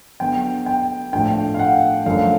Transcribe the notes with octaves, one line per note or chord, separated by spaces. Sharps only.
D3 F#3 B3 G5
G5
A2 F3 A3 D4 G5
F5
F#5
F#2 D3 F3 A3 F5